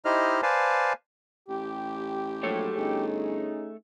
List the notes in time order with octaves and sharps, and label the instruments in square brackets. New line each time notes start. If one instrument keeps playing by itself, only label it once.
[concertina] D#4 E4 G4 C5 D#5 F6
B4 C5 D5 F5 G#5 A5
[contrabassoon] A1 [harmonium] G4
[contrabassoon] A#1 [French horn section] G#2 F#3 C5 [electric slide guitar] A3 A4 C#5
[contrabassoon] G1 [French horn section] C#4 D#4 G#4